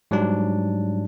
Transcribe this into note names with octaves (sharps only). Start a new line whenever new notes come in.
G#2 F#3 G3 D4